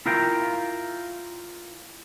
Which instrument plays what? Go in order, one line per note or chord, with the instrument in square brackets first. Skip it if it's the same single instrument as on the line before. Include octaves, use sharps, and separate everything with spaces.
[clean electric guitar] E4 F4 A#4 F5 G5